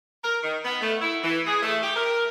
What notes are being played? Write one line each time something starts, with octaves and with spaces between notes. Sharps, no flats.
A#4
D#3
B3
A3
E4
E3
G#4
A3
G4
A#4